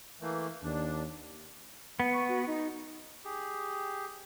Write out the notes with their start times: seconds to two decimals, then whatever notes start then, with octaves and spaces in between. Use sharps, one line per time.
0.21 E3 A3 A#3
0.63 D#2 D4
2.00 B3
2.13 C#6
2.29 F#4
2.47 D#4
3.24 G4 G#4